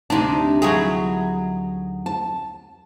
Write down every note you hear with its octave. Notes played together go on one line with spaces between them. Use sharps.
D2 C3 D4 D#4 A5
F#3 E4 G#4
A5